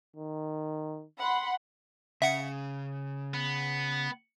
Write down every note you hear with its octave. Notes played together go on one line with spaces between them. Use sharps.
D#3
F#5 B5 C6
C#3 E5 F#5 C#7
B3